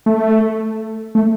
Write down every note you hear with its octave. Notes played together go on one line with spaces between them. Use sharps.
A3
A3